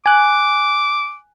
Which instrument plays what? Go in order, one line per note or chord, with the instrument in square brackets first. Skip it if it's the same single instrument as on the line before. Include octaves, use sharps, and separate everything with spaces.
[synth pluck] G#5 F#6 [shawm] D6